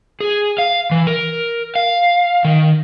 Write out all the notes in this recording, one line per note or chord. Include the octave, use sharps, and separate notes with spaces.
G#4
F5
E3
A#4
F5
D#3